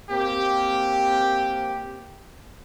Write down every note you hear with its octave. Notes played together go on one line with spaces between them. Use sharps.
A#3 C4 G4